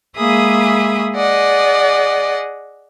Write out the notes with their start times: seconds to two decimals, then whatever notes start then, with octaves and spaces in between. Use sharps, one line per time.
0.17 G#3 A#3 G#4 E5 B5 D#6
1.14 G#4 D5 D#5 F#5